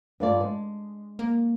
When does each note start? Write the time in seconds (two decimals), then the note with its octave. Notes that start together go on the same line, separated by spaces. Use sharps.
0.20 G2 F4 D5
0.41 G#3
1.19 A#3